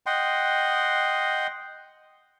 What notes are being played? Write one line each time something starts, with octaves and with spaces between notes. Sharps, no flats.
D#5 F#5 G5 C6